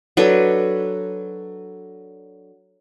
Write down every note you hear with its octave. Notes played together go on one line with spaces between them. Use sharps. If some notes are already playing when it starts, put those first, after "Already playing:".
F#3 D4 A4 B4